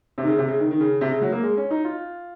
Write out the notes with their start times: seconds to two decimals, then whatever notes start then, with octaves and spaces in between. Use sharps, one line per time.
0.18 C3
0.23 D#3
0.27 C#3
0.38 C3
0.48 C#3
0.60 D#3
0.71 D#3
0.80 C#3
1.01 C3
1.11 C#3
1.22 F#3
1.32 A#3
1.43 G#3
1.57 C#4
1.71 D#4
1.85 F4